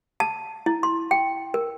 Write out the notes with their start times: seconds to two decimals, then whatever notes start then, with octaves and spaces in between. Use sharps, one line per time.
0.20 A5
0.66 E4
0.83 C6
1.11 G5
1.54 A#4